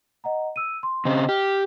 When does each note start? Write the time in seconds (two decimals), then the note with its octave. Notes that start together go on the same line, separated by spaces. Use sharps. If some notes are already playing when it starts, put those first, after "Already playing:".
0.24 D#5 F#5 A#5
0.56 E6 D#7
0.83 C6
1.05 C#3 C4 D#5
1.29 G4 F6